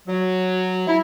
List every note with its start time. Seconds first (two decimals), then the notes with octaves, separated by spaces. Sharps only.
0.07 F#3
0.87 E4